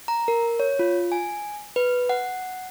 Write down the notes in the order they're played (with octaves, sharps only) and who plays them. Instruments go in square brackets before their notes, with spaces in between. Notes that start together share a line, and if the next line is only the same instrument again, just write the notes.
[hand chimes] A#5
A#4
C#5
F4
G#5
B4
F#5